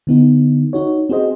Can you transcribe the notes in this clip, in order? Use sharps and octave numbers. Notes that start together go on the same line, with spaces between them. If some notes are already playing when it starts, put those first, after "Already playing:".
D3 B3 D#4
D#4 F#4 C#5
C4 F#4 G#4 C5 D#5